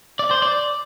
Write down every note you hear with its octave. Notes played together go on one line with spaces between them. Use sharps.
D5
C5
D5